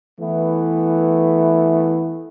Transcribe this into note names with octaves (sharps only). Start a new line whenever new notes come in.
E3 A3 B3 E4